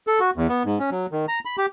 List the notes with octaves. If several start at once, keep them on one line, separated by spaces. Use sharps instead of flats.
A4
F#4
E2
B3
G#2
C#4
F#3
D#3
A#5
B5
G4